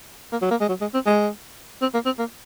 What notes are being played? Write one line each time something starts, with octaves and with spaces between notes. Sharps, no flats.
A#3
F#3
A#3
G#3
F#3
G#3
C4
G#3
C4
A#3
C4
A#3